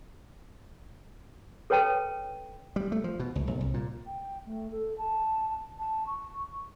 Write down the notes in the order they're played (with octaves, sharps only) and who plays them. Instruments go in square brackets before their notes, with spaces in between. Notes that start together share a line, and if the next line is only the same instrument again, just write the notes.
[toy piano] A4 B4 C#5 G5 A5
[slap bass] G3
A3
F3
B2
C#2
A#1
C2
A#2
[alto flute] G5
A3
A4
A5
A5
C#6